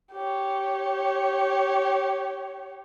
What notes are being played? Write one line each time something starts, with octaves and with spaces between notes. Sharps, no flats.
G4 C#5